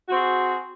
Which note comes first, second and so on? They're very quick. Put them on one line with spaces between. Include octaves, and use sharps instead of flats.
F#4 C4 G#4